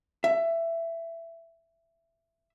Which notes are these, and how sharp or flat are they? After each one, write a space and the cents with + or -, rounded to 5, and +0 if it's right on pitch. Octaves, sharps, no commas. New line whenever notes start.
E5 +15